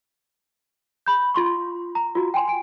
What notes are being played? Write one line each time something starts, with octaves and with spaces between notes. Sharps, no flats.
B5 G6
F4 C6 C#6
A#5
F4 F#4
G5 G#5 C6
G#5 D7